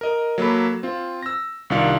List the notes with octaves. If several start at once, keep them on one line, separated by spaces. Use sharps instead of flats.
A#4 D#5
F#3 A#3 A4 B5
C4 F4
E6 A#6
C2 D#3 D4 F4 F5 C#7